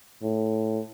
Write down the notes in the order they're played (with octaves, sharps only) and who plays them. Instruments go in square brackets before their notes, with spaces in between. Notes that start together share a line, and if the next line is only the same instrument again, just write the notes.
[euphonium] A2